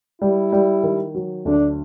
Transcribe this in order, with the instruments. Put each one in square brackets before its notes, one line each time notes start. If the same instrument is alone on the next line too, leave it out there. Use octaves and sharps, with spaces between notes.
[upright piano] G3 [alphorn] E4
[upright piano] G3
D#3
F#3
[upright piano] D2 [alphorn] D4